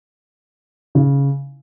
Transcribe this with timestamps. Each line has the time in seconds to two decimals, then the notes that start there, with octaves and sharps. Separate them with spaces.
0.95 C#3